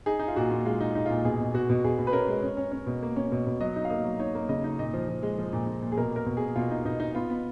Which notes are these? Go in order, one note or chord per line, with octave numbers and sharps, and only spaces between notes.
D#4 G#4
D#4
F4
A#2 F#4
A#2
G#3 F4
D#4
D#4
A#2 F4
B2 G#4
B2
B2 F#4
B2
B2 G#4
B2
B4
C#4 A#4
G#3
C#4
C#4
C#4
B2
A#3
C#4
B2
B2
F#3 D#5
D#4
F5
A#3 D#5
F#3
D#4 C#5
A#3
C#3 D#5
D#4
A#2 D#5
F3
F3
G#3
F3
A#2
A#2
A#2
G#4
B2 A#4
A#3 A#4
B2
A#3 G#4
B2 F4
D#4
B2 D#4
D#4
B3 F4
B3